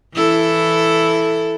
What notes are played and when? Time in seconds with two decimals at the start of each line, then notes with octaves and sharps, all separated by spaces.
0.14 E3 E4 A4